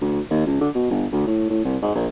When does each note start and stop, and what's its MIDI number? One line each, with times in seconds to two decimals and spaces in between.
0.01 0.21 38
0.30 0.42 39
0.47 0.60 37
0.61 0.70 50
0.75 0.86 47
0.90 1.07 31
1.13 1.26 38
1.27 1.46 45
1.50 1.63 45
1.65 1.78 36
1.82 1.93 44
1.95 2.07 34